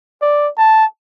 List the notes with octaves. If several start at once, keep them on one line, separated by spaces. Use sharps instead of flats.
D5
A5